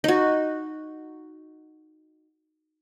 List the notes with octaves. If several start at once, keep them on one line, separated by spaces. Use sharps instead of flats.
D#4 F#4